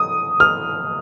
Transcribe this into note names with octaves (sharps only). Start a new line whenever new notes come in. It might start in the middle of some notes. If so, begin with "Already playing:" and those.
Already playing: D#6
F6